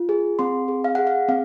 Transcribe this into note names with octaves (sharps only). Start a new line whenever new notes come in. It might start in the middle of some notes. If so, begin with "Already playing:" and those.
Already playing: F4
G#4
C4 C6
G#4
F5
G#4 F#5
F5
C4 F5